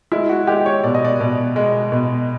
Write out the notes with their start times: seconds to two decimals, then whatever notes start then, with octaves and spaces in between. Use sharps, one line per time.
0.12 G#3 E4
0.29 F#4
0.47 G#3 G4
0.66 C#5
0.83 B2 D5
0.94 D#5
1.05 D5
1.20 B2
1.56 G#3
1.92 B2